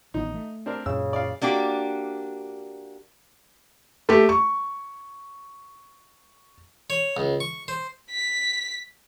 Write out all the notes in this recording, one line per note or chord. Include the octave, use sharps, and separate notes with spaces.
A1 D#3 B3 D#4
A3
C4 D4 A#4
F#2 A#2 C#3 E6
D5 F5
A#3 D4 F#4 G4
A3 G4
C#6
C#5
C#2
C#6
C5
B6